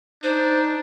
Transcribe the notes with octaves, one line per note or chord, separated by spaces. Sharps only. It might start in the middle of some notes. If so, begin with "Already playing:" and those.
D4 D#4 C5